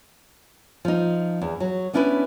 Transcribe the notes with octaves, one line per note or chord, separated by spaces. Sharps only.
F3 D#4
E2
F#3
B3 C#4 D4 E4 F#4 B4